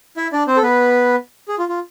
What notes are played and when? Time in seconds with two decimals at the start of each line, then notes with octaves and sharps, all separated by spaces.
0.17 E4 E5
0.33 D4 D5
0.47 C4 C5
0.57 A4
0.63 B3 B4
1.48 G#4
1.59 F4
1.69 F4